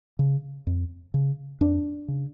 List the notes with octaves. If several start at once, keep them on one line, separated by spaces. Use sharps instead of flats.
C#3
F2
C#3
F2 D4
C#3